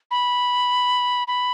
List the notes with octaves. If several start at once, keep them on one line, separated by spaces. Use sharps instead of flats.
B5
B5